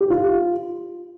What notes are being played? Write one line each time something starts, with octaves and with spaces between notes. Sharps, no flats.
G4
F4